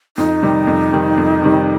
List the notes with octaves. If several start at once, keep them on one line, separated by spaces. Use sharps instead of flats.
F2 D#4
C3 D#3 G3
F2
C3 D#3 G3
F2
C3 D#3 G3